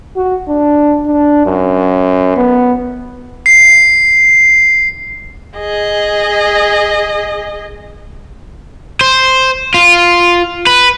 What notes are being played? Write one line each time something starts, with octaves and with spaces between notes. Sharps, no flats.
F#4
D4
D4
F#2
B3
C7
G#4 D#5
C5
F4
B4